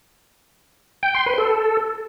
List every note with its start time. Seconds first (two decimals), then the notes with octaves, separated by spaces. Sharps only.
1.03 G5
1.15 C6
1.26 B4
1.38 A4